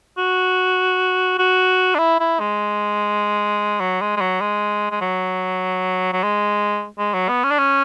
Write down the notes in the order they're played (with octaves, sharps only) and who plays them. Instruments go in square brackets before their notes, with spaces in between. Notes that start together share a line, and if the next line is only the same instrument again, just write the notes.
[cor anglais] F#4
F#4
D4
E4
E4
G#3
F#3
G#3
G#3
F#3
G#3
G#3
F#3
F#3
G#3
G#3
F#3
B3
C#4
D4
C#4